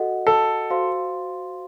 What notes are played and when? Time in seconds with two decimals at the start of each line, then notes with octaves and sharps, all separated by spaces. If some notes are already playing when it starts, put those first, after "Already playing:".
Already playing: F#4 A4 D#5 F#5
0.27 A4
0.70 F#4 C5 F5 C6